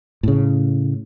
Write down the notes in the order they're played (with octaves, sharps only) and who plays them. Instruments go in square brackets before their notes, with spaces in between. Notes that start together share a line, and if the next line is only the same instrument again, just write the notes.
[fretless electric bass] A2 C#3